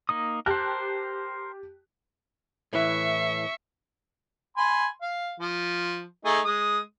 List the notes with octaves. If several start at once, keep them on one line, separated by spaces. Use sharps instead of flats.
A#3 D#4 D#6
G4 A#4 C5 A5 F#6
A2 E3 E5 C#6
G#5 B5 C6
F5
F3
A3 D#4 G#4
G#3 D#6